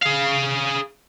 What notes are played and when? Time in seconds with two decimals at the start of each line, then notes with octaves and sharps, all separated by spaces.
0.02 G#4 F5